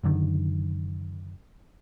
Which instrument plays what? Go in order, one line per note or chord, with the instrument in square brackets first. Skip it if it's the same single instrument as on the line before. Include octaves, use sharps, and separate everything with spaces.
[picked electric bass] F#1 F#2 D3 D#3